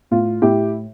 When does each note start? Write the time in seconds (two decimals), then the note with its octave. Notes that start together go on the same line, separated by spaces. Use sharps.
0.11 A2 F4
0.42 A2 E4 G4